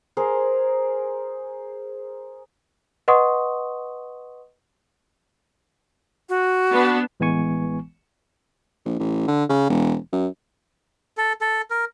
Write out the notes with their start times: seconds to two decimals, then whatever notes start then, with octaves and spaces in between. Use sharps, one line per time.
0.17 G#4 A#4 C5
3.08 B4 D#5 F#5 C6 C#6 D#6
6.29 F#4
6.71 B3 D4
7.20 A1 E3 G#3 B3 G#5 C#6
8.85 A#1
8.99 A1
9.28 D3
9.49 C#3
9.69 E1
10.12 F#2
11.17 A4
11.41 A4
11.70 A#4